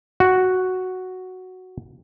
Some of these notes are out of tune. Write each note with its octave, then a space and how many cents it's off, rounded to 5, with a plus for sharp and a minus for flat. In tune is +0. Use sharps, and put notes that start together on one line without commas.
F#4 +0